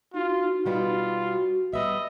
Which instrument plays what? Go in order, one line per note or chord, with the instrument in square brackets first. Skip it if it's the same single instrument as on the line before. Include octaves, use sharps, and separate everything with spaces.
[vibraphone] D#4 F#4 [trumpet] F4
[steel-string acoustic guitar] B2 G3 B3 [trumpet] F4
[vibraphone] F#4
[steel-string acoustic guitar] G3 B3 E5 [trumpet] D#5 [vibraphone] E6